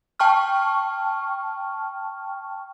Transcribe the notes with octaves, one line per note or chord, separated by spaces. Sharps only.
G5 A5 C#6 F6